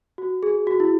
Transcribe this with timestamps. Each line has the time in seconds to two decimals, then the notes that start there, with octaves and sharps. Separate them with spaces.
0.18 F#4
0.43 G#4
0.67 F#4
0.80 E4